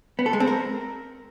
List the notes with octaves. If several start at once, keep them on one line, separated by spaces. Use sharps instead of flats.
B3
A4
G#3
C4
A#4